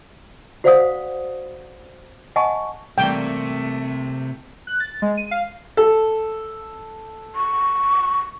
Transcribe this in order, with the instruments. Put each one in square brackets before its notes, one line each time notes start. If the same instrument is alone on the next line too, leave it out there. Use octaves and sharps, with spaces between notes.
[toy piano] F#4 C5 D5 F5 F#5 D#6
D#5 F#5 G#5 A5 C#6
[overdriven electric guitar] C3 [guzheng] E3 G3 A#3 [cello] A3 [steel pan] G5
[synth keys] F#6
A6
G#3
D#7
F5
[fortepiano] A4
[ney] C#6